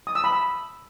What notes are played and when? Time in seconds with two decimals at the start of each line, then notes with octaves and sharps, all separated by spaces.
0.07 D#6
0.15 E6
0.24 B5
0.32 E6